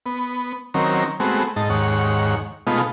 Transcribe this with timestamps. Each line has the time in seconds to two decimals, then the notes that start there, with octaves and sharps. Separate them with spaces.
0.06 B3
0.74 D#3 F#3 C4 C#4 A#4
1.20 G#3 A3 B3 C4 F#4
1.56 G#2 D#4 A5
1.70 D#2 G#2 C#5 F#5
2.67 B2 G#3 A3 B3 D#4 F4